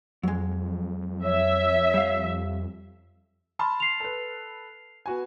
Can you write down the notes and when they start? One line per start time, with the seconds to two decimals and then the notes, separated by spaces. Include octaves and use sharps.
0.23 F2 F#3 G#3
1.23 C#5 E5
1.94 G3 F5
3.59 A5 B5 C6 F6
3.80 C7 F7
4.00 A4 B4
5.06 B3 F#4 G#5